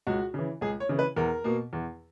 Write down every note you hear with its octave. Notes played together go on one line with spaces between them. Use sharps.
C#2 F#4
C#3 E3
C#2 G#4
C#5
C#3 E3
B4
E2 A#4
B2 A#3
E2